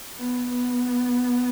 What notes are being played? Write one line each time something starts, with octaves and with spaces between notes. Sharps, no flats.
B3
B3